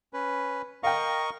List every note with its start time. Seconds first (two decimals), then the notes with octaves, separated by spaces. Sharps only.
0.13 C#4 B4
0.83 A#4 D#5 F5 G5 C#6